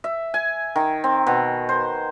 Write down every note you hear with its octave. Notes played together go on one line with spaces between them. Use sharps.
E5
G#5
D#3
C4
B2
C5